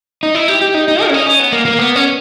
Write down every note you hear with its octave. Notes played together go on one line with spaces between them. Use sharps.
D#4
E4
G4
G4
D#4
D#4
A#4
C#4
D#4
C#4
B3
A#3
A#3
B3
C#4